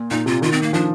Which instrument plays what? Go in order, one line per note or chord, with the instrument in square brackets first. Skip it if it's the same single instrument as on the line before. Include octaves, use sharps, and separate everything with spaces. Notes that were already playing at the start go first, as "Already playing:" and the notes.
Already playing: [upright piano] A#2
[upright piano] A#2 [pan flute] D#4
[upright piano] C3 [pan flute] F4
[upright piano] D#3 [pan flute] F4
[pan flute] C4
A#3
[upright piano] F3 [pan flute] D4